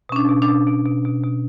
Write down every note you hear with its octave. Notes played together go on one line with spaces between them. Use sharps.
B2 C#4
D4
B2
D4
B2
B2
B2
B2
B2